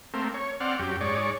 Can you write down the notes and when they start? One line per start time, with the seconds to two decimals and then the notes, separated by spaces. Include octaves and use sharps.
0.14 A3 A#3 C4
0.34 C#5
0.61 C4 D5 F#5 F6
0.79 F#2 G4
1.01 G#2 C#5 D5